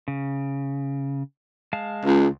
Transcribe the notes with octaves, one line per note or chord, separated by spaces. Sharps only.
C#3
G#3 F5 A5
C#2